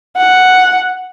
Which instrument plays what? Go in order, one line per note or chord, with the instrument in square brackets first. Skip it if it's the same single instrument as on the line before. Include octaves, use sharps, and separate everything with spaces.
[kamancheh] F#5